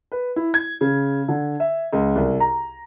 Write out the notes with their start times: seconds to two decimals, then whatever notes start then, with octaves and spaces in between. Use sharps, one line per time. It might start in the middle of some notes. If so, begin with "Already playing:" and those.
0.12 B4
0.36 E4
0.54 G#6
0.81 C#3
1.28 D3
1.60 E5
1.93 C#2
2.15 C2
2.40 A#5